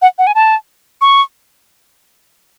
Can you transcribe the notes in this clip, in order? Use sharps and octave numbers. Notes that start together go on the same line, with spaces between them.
F#5
F#5
G#5
A5
C#6